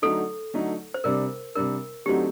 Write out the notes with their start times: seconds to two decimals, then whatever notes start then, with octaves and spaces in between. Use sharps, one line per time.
0.02 D3 F#3 A3 D#4 A4
0.54 D3 F#3 A3 D#4
0.94 C5
1.04 C3 G3 D4 A#4
1.56 C3 G3 D4 A#4
2.06 D3 F#3 A3 C4 D#4 G4